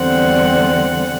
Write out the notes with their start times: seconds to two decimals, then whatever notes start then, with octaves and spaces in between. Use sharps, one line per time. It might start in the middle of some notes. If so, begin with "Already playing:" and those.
Already playing: E2 D3 G3 C4 F#5